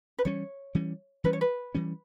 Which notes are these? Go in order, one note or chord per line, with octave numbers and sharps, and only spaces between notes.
B4
E3 G3 C#4 C#5
E3 G3 C#4
E3 G3 C#4 B4
C#5
B4
E3 G3 C#4